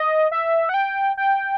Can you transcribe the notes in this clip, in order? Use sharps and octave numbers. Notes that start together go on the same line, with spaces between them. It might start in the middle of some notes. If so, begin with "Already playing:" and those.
Already playing: D#5
E5
F#5
G5
G5